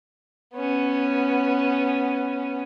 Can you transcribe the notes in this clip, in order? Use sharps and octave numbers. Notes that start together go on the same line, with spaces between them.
B3 C#4